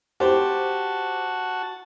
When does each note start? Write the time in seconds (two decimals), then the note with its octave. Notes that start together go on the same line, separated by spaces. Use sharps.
0.20 F#4 G4 C5 A5